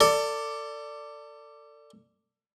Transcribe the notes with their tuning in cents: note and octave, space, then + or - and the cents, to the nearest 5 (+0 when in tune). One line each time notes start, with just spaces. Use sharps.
A4 +35 D5 +0